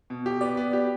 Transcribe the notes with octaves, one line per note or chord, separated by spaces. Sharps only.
B2
G4
B3 D5
B3
G4